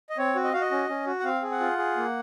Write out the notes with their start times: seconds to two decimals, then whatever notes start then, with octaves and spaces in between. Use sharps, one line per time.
0.10 D#5
0.18 C4 C#5
0.35 F#4
0.44 D#5
0.53 F#4 F5
0.61 D#5
0.71 C#4
0.89 C#4
1.07 F#4
1.20 F#5
1.24 C4 F5
1.43 G#4
1.51 F#5
1.60 F4
1.78 G#4
1.96 A#3